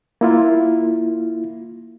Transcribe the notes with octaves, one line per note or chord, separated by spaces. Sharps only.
A#3 E4 F4